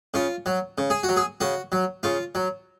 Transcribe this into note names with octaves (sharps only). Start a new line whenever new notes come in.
C#3 F4
F#3
C#3
G#4
F#4
F#3
G#4
C#3 F#4
F#3
C#3 F4
F#3